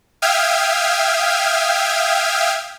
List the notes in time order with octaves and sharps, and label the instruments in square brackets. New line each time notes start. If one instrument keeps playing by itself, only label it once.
[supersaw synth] E5 F5 G5 D#6 F6 G#6